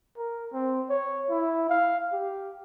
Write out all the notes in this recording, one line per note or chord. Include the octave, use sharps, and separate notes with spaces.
A#4
C4
C#5
E4
F5
G4